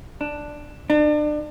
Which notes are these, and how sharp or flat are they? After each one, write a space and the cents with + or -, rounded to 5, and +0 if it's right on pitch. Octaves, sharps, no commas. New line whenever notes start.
D4 +5
D4 +35